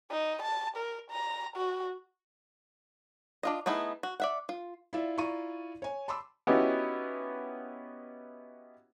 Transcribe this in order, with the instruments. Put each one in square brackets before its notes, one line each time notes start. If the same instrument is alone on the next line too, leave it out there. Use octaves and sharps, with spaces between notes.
[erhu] D#4
A5
A#4
A#5
F#4
[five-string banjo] D4 F4 D#5
A3 B3 D#4 E4 G#4
F#4
D5 E5 F#5
F4
[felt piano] E4 F4 D5 E5
E4 F4 D5 A#5 C#6 D#7
C#5 G#5
A5 B5 C6 D6 E6
[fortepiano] B3 C#4 D#4 E4 F#4 G4